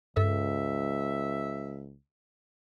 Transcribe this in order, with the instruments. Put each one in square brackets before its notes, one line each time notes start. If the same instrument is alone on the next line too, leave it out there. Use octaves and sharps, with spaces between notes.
[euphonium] C#2 [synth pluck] G2 A4 [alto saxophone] E5